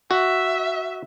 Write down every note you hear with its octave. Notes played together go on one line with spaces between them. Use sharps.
F#4 E5